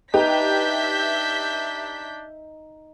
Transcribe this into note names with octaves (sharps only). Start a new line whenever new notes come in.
D4 D#4 G4 B4 E5 G6 B6